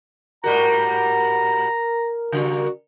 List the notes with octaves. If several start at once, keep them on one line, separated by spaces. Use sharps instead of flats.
G#2 G3 F#4 A#4 A#5
C#3 G3 A#3 F#4